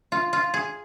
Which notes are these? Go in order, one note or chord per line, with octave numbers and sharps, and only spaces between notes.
F4
F4
G#4